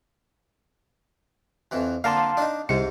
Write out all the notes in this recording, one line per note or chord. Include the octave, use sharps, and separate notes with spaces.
F2 E3
D3 A#3 A#4 F5 A5 C6
D4 D#4
C2 G#2 C3 C#7